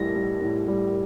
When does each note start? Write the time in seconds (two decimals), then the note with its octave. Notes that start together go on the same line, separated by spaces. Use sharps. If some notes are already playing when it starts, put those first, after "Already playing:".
Already playing: A2 G3 A#6
0.16 G3
0.42 A2
0.68 G3